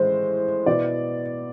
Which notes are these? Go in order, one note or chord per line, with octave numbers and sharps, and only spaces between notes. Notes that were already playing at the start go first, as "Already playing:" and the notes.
Already playing: A2 G#3 C5
B2 B3 E4 D5